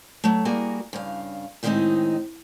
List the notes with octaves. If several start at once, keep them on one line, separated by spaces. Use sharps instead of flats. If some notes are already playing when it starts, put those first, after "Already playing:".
F#3 A3
G3 A#3 F#4 G#4 A#4
G2 C#3 F5
A2 D#3 G3 G#3 C4 D#4